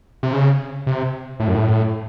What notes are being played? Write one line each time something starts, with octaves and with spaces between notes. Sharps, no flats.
C3
C#3
C3
A2
F#2
A2